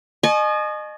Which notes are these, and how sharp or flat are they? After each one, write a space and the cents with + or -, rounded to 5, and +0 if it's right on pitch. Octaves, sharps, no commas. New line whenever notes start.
D#5 -30 G#5 +40 C#6 -5